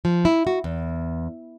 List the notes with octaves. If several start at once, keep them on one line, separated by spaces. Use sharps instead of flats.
F3
E4
F#4
E2